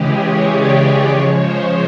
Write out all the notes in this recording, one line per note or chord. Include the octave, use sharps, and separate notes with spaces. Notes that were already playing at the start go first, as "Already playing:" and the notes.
Already playing: C#3 E3 G#3 G4 G#4
C#5
D5
C#3 F3 G#3 C#5
C5